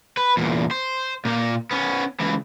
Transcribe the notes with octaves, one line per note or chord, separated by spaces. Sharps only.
B4
E2 A#2
C5
A#2 A#3
B3 C#4
C#2 E3